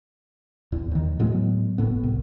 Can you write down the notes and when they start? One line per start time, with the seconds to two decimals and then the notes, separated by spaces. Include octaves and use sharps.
0.72 E2
0.91 D#2 D#3
1.19 A2 F#3 G#3 B3
1.78 G1 A2 B3
2.03 C2